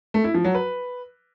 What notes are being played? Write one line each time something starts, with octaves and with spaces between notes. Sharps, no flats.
A3
E4
F3
F#3
B4